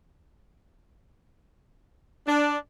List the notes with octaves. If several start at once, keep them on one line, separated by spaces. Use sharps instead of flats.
D4